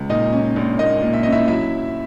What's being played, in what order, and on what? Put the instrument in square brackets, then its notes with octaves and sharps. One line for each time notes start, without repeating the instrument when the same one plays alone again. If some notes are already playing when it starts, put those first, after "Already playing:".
Already playing: [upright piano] C#2
[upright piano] A#2 [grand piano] D#4 D#5
[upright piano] C#4
A#1
[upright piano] A#3 [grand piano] D#4 D#5
[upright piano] A#2
[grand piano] E5
[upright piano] C#4 [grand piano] D#5
[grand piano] E4 E5
[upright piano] F#3 [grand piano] E4 E5